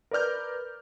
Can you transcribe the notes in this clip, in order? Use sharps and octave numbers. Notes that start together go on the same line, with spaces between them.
A#4 B4 D5 F6 G6